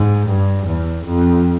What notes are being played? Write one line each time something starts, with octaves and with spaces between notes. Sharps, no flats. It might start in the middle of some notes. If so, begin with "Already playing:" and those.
Already playing: G#2
G2
E2
F2